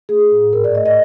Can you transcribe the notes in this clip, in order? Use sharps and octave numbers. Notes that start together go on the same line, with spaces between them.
A3 G#4
A2
G#2 A#4
D5
A3 D#5
D#5